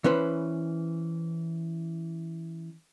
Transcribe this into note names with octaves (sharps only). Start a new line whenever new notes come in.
E3 C#4 B4 C5